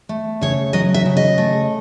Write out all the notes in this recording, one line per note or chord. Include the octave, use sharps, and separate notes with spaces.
A3
C#3 C#5
F#3 D#5
E5
C#3
D#5
A3